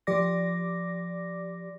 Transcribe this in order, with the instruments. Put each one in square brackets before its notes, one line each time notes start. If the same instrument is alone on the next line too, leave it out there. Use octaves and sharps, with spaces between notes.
[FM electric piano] F3 G4 D5 D6 A#6